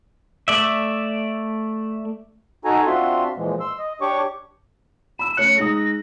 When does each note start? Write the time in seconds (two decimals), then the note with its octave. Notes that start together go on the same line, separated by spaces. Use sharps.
0.48 A3 D5 E5
2.65 D#4 F#4 A4 G#5 A#5
2.86 C4 D4 F4 F#4 E5 C6
3.37 A#2 E3 F3 G#3
3.60 C6 E6
3.78 D#5
4.01 D4 G4 C#5 C#6 D6
5.19 B5 E6 E7
5.37 A3 C#4 F#6 C#7
5.58 G#3 D#4 D#6 A#6